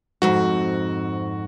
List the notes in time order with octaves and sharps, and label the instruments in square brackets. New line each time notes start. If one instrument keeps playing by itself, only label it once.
[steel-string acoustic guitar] F2 G#2 C4 [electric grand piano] F#4